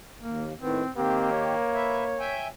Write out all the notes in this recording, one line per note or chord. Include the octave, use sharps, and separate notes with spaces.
D#2 A#3
A2 D#3 B3 C4
D#3 A#3 C4 G4
C#5
B4 E5
E5 G5 G#5